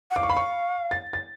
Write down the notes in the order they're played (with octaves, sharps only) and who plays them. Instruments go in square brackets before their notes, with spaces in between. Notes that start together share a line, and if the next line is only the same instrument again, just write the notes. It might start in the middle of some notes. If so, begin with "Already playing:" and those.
[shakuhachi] F#5
[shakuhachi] F5 [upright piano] D6
[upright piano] C#6
B5
C#6
A6
A6